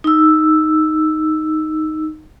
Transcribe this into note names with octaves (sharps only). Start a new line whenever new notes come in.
D#4 E6